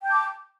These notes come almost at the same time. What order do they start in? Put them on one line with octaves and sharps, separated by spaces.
G5 G6 A5 D6